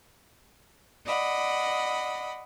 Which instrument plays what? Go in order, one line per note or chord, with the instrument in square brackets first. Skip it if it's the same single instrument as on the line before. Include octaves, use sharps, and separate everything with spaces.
[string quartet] D5 D#5 F#5 B5